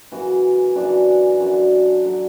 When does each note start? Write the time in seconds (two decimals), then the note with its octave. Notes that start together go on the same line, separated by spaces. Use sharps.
0.12 F#2 C#3 E3 F#4
0.75 F#2 C#3 E3 D4
1.40 F#2 D3 F#3
2.05 D3 F#3